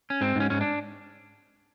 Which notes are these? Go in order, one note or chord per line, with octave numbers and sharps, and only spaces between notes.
C#4
G#2 C4
G#2 C#4
G#2 C#4
D4